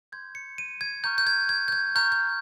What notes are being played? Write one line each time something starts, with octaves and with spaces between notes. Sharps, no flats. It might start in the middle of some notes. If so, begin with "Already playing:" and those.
C6 G6 G#6
C#7
D#7
G#6
A#5 C#6 F6 G6
G6
G#6
G#6
G6
G#6
A#5 C#6 F6 G6
G6